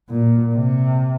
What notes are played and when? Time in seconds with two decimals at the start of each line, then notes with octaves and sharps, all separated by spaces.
0.09 A#2
0.55 C3